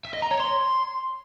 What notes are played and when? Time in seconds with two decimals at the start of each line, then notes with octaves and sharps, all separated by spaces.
0.05 E5
0.14 D#5
0.22 A#5
0.31 C#5
0.40 C6